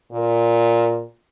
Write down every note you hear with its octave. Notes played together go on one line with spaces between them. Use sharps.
A#2